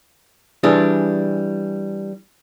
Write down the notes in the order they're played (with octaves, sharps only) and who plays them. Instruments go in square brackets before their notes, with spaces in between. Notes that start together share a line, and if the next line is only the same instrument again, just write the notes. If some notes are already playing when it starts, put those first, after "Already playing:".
[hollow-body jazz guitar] E3 G3 D4 G#4